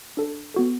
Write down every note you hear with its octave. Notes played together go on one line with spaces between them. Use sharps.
D4 A4
B3 F#4 A4